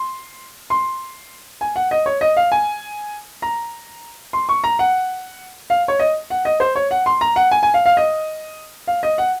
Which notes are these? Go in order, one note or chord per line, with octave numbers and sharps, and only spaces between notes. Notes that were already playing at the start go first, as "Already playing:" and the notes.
Already playing: C6
C6
G#5
F#5
D#5
C#5
D#5
F5
G#5
A#5
C6
C#6
A#5
F#5
F5
C#5
D#5
F#5
D#5
C5
C#5
F#5
C6
A#5
F#5
G#5
G#5
F5
F5
D#5
F5
D#5
F#5